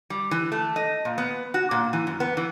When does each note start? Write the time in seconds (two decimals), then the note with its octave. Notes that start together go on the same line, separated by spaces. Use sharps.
0.10 G3
0.31 E3
0.52 A3
0.76 D#5
1.05 A#2
1.18 B3
1.54 F#4
1.71 A#2
1.93 E3
2.07 F#2
2.20 B3
2.37 E3